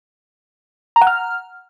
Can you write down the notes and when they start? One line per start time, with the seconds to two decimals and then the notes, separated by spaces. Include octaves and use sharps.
0.96 A#5
1.01 F#5
1.07 F6